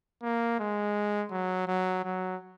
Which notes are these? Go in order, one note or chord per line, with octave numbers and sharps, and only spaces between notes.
A#3
G#3
F#3
F#3
F#3